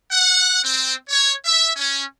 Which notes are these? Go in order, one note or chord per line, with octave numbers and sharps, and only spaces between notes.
F#5
C4
C#5
E5
C#4